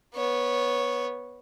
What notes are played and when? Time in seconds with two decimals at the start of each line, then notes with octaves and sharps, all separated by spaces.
0.14 B3 C#5